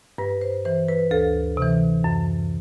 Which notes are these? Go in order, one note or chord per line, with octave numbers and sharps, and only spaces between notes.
G2 B4
C5
E3 C5
B4
D2 A4
C3 E3
F#2